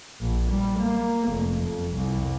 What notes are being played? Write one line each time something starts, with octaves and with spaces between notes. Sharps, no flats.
A#1
G3
A#3
F1
F2
C2